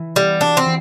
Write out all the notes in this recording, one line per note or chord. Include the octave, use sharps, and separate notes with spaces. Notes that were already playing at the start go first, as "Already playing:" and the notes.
Already playing: E3 E4
G3 B3
D4 F#4
C4
E3